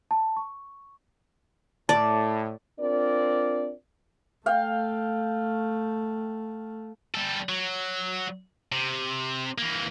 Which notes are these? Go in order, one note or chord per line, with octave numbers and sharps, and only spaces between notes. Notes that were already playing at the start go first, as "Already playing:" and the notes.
A5
C#6
A2 D5 A5
C4 D4 F4 A#4 D5
A3 F5 G5
G3 A4
F#3
C3
E3 A#3